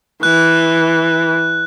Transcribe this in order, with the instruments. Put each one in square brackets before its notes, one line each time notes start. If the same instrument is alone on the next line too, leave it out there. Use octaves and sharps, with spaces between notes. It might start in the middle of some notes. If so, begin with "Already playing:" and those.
[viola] E3 [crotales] F#6